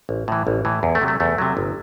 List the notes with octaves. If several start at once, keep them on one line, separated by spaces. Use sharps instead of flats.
A1
A2 E3
A1
A2 E3
E2
A3
C3 F#3
A3
E2 A3
C3 F#3
G1